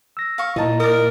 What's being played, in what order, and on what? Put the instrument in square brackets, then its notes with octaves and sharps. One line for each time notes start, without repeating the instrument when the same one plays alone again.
[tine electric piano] E6 A#6
[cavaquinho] F5 C#6
[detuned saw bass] A#2 [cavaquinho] D#4 A5 [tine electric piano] E4 D#5 A#5
[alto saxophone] A#4 [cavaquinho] D5 D#6